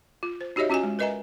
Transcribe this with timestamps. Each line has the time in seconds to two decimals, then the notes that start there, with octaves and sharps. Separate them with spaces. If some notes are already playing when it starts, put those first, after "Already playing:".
0.23 F4
0.41 C5
0.56 D#4 F#4 G4 C#5 D#5 E5
0.70 C#4 F4 F#4 D#5 G#5
0.83 G#3
0.99 A#4 B4 D#5 E5 G#5 A#5